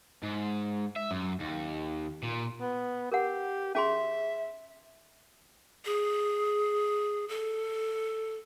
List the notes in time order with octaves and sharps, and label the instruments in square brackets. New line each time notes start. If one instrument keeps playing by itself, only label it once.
[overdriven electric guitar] G#2
E5
F#2
D#2
A#2
[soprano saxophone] B3
[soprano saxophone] G4 [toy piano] A#4 F#5
[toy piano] C#4 G#4 C6 [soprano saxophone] E5
[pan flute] G#4
A4